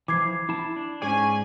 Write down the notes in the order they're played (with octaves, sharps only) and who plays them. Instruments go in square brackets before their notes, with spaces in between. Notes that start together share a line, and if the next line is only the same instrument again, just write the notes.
[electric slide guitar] E3 F3 [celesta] D6 G#6 C7
[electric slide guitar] E4 A5
D4
[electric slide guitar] G#2 G#4 D5 [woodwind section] C#4 G#5